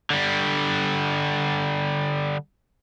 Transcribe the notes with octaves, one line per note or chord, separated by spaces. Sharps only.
D3 G3